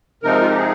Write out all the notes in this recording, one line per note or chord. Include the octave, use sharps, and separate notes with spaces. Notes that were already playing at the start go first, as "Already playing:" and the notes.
C3 F3 G#3 C4 D#4 A#4
F4
G4
G#4